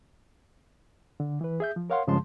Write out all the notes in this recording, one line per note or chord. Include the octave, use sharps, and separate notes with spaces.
D3
E3 B4
G#4 E5 G6
F3
A#4 C#5 F5 F#5 C6
G2 C#3 F3 G#3 A5 C6